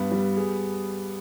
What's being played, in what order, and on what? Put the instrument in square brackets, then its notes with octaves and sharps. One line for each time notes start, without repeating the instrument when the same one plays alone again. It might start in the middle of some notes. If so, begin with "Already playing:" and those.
Already playing: [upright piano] G2 [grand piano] B3
[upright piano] G3
G#4